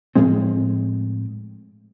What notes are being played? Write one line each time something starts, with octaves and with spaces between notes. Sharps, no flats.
A2 F3 G#3 C4